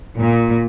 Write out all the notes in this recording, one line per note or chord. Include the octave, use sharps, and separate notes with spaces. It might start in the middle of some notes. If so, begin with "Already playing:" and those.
A#2